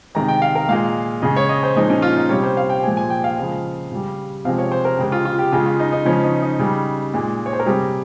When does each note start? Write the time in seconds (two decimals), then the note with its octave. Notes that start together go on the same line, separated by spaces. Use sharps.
0.15 C3 D#3 G#3 A#5
0.28 G5
0.42 F5
0.55 A#4
0.69 A#2 G#3 F5
1.22 C#3 G#3 D#5
1.36 C#5
1.49 D#5
1.63 C5
1.76 A#2 F3 G#3 D#4
1.90 C#4
2.02 F4
2.16 D#4
2.29 C3 G3 C#5
2.43 C5
2.57 F5
2.70 G5
2.83 A#2 F3 G#3 G#5
2.97 G#5
3.10 G5
3.24 F5
3.37 C#3 F3 G#3
3.92 C#3 G3
4.45 C3 F3 G#3 F5
4.58 C#5
4.72 C5
4.85 A#4
4.99 C#3 G#3 G4
5.12 F4
5.25 F4
5.39 G4
5.52 C#3 G#3 F4
5.66 F4
5.79 D#4
5.92 D#4
6.05 C#3 F3 G#3 C#4
6.24 D#4
6.42 D#4
6.59 C#3 G3
7.14 A#2 G#3
7.46 C#5
7.53 C5
7.60 A#4
7.66 C3 G3 G#4